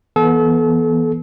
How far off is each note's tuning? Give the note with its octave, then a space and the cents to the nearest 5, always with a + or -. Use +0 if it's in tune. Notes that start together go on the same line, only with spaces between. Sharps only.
E3 +0 B3 -25 A4 -35